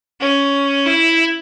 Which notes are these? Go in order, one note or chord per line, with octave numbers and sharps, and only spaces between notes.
C#4
E4